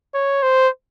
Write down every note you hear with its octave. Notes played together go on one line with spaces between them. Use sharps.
C#5
C5